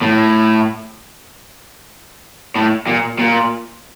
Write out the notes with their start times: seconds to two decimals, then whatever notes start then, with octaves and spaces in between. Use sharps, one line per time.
0.02 A2
2.55 A2
2.87 A#2
3.19 A#2